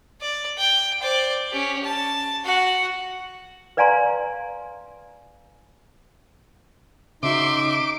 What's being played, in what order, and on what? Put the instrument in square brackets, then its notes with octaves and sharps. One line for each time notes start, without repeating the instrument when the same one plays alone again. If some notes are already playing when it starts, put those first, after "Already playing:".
[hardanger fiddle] D5
G5
C5 D5
C#4 G4
A5
F#4 F#5
[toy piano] B4 D5 F5 G#5 A#5 C6
[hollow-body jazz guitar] C#3 F#4 [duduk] D#4 [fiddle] E5 C6 [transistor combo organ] D6